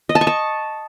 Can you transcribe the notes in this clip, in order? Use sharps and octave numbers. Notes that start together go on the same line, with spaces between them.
D#5
A5
C#6
A5